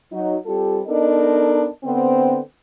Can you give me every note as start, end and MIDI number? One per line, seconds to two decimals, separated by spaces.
0.12 0.36 54
0.12 0.36 63
0.45 0.80 55
0.45 0.80 60
0.45 0.80 65
0.45 0.80 67
0.45 0.80 69
0.87 1.67 59
0.87 1.67 62
0.87 1.67 63
0.87 1.67 69
0.87 1.67 70
0.87 1.67 75
1.84 2.39 50
1.84 2.39 59
1.84 2.39 60